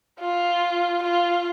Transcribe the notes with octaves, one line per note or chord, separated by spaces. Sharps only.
F4
F4